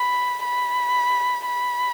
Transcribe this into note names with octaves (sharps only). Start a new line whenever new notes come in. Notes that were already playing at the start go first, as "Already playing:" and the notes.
Already playing: B5
B5
B5